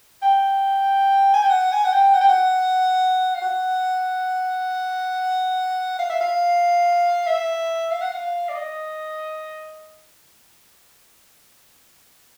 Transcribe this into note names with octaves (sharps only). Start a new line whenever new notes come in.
G5
G#5
G5
F#5
G#5
F#5
G5
F#5
G5
F#5
F5
F#5
F5
E5
F5
E5
F5
F#5
F5
D5
D#5